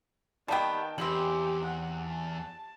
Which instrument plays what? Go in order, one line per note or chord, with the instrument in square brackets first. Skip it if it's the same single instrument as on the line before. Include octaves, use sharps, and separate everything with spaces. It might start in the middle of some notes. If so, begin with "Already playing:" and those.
[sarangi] D#3 [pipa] G3 A#3 B3 [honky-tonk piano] G5 A5
[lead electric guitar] E2 [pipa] D#3 B3 C4 [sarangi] G4 [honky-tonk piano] F#7
[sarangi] F#5
A5